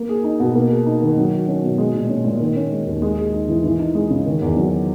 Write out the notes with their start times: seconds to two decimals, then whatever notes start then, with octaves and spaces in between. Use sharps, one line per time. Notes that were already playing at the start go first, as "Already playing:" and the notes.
Already playing: A#3
0.09 G#4
0.24 D#4
0.40 B2
0.55 A#3
0.71 G#4
0.86 D#4
1.02 D#3
1.17 F#3
1.33 F#4
1.48 C#4
1.63 B2
1.78 G#3
1.94 A#2
2.09 C#4
2.25 A#2
2.40 D#3
2.56 C#4
2.72 G#3
2.86 D#2
3.02 G#3
3.18 G#4
3.33 D#4
3.48 E3
3.64 E3
3.80 D#4
3.95 G#3
4.10 C#3
4.26 D#3
4.42 E2
4.56 F#3